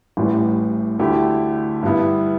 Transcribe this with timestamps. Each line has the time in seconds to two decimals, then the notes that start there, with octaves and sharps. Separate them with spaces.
0.17 A1 A2 E3 G3
0.99 D2 D3 A3 E4 G4
1.83 G2 G3 B3 E4